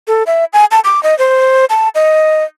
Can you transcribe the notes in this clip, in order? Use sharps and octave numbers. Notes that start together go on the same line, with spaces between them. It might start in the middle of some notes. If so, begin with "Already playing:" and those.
A4
E5
G#5
A5
D6
D#5
C5
A5
D#5